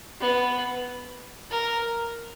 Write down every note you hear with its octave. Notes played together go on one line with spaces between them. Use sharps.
B3
A#4